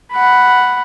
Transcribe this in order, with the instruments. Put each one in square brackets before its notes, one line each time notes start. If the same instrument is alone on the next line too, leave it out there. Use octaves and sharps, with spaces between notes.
[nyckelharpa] F#5 B5